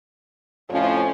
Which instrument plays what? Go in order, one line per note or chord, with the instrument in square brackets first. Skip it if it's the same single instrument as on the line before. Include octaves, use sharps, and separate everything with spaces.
[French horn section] F2 A2 F3 [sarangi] C#4